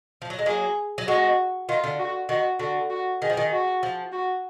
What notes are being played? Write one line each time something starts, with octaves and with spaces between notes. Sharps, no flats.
F3
F#3
G#3
F#3 A#3 G#4
F#3
G#3 F#4
D#3 F4
D3
F#4
D#3 F#4
D3 F#4
F#4
D#3 G#4
F3
D#3
F#4
F3
F#4